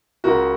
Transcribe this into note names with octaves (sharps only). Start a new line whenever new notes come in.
C#2 F#4 A#4